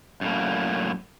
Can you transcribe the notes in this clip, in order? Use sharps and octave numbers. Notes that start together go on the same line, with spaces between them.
F#2 A2 A#3